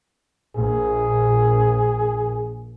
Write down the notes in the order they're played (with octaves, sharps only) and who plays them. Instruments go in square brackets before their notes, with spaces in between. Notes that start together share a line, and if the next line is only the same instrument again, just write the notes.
[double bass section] A#1 [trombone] G#4